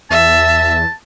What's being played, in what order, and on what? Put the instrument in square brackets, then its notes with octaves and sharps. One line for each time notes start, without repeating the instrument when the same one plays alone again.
[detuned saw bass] E2 [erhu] E5 [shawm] A5